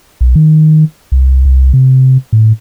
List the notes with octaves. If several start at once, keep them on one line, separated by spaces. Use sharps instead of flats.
B1
D#3
C2
C2
C3
A2